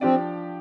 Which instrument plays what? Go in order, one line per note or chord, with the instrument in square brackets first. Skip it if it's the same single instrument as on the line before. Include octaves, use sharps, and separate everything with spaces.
[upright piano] F3 D4 G4 D5 [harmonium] C4